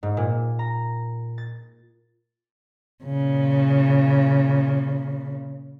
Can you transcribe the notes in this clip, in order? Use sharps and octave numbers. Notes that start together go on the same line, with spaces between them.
G#2
A#2
A#5
A6
A#2 C#3